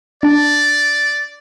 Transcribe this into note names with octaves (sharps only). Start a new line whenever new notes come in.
D4 D5 A5